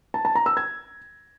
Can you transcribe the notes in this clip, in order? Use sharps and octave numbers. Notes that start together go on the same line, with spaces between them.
A5
A5
A#5
E6
G#6